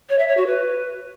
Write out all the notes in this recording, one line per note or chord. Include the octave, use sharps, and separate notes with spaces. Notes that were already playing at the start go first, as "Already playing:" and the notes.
C#5
E5
C#5
F#4
B4